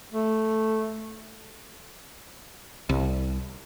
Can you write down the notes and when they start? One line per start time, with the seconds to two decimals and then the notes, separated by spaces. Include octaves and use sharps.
0.12 A3
2.89 C2